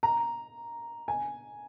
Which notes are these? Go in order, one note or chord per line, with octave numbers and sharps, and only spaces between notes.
A#5
G#5